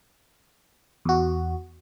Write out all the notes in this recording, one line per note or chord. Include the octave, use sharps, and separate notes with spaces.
E2 F#4